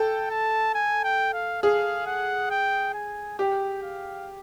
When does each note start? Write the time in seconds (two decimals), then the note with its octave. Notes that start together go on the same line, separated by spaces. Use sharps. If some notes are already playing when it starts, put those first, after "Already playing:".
Already playing: A4 G5
0.30 A5
0.74 G#5
1.04 G5
1.33 F5
1.63 G#4 F5
2.07 F#5
2.51 G5
2.94 G#5
3.38 G4 G5
3.82 F5